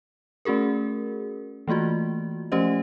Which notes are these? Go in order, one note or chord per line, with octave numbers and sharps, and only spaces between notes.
A3 C#4 F#4 G#4 A#4
E3 A3 A#3 F4 F#4
F3 A3 C#4 G4 C5 D#5